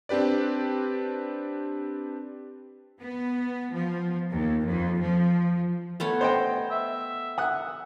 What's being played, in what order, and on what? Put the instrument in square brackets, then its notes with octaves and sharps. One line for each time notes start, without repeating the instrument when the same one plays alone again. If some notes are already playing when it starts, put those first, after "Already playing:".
[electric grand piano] C4 D4 G4 B4 D5
[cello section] B3
F3
D#2
F2
F3
[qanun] A3 B3 C#5
[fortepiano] C5 D#5 G5
[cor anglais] E5
[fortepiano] F#5 D#6 F#6